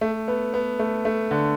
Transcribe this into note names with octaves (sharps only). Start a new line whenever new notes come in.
A3
B3
B3
A3
A3
D3